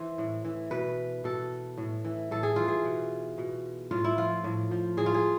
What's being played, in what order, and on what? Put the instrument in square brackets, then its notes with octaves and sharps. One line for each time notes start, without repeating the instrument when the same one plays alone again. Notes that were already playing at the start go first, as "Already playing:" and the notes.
Already playing: [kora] E3 C5
A2
E3
B2 B4
B2 A4
A2
E3
A2 A4
G#4
E3 F4
G#4
B2
B2
A2 F4
E4
F3 F4
A2
F3
A2 G#4
F4
G#4